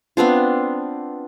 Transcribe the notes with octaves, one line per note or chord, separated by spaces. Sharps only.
B3 C4 D4 F4